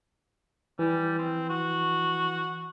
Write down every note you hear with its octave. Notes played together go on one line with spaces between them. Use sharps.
E3 G3
C4
F#4